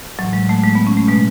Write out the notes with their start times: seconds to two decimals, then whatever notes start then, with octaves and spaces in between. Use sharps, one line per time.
0.19 A2 E3 F#3
0.33 G#3
0.49 A3
0.64 G#3
0.75 B3
0.87 C#4
0.97 A3
1.08 B2 G#3